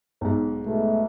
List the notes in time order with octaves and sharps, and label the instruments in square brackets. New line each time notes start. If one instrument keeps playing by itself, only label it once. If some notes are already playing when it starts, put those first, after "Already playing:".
[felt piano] B1 G#2
[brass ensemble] B2 G#3 A3